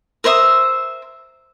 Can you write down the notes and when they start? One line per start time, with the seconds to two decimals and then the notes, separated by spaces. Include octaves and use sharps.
0.24 A#4 C5 E5 D#6